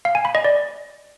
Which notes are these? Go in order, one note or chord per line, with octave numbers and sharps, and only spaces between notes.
F5
G#5
B5
D#5
D5